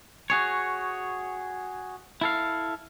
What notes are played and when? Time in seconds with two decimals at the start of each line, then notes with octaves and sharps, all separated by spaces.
0.30 F#4 G#4 C#5
2.21 E4 A4 F5